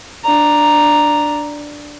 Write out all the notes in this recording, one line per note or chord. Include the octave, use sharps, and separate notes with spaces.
D4 A#5